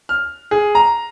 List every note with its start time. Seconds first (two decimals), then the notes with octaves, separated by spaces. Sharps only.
0.09 F6
0.51 G#4
0.75 A#5